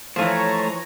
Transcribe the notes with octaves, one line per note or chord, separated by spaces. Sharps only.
E3 F3 A3 C5 C#5 G#5 A#5